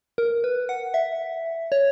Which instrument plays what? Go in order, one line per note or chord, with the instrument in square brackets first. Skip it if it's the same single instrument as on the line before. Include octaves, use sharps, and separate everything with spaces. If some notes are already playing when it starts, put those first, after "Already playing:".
[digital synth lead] A#4
B4
F#5
E5
C#5